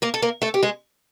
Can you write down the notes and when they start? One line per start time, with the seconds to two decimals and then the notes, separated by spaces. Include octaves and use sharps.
0.02 A#3 A#4
0.14 A4
0.22 A#3 A#4
0.42 A3 A4
0.54 G4
0.63 G#3 G#4